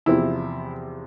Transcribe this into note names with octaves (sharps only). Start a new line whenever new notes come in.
E2 C3 F3 C4 E4